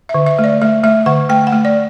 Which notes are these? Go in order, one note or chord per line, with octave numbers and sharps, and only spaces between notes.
E5
D3
E5
A3
D5
A3 E5
A3 E5
D3 F#5
A3 G5
F#5
A3
D5